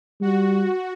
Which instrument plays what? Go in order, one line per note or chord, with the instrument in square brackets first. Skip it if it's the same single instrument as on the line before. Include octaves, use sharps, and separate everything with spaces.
[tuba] G3 [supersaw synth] F#4